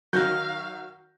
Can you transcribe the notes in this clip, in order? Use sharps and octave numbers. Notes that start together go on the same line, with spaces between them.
D#3 F#3 F#4 F5 G6 A#6